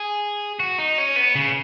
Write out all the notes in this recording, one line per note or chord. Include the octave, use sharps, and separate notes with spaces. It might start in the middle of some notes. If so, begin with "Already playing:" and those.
Already playing: G#4
F#4
D#4
C#4
B3
C#3